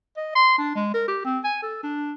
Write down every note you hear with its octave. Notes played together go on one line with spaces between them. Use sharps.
D#5
C6
D4
G#3
A#4
G4
C4
G#5
A4
D4